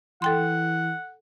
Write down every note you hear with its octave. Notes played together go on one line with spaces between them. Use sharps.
E3 A4 F#5 G5 C6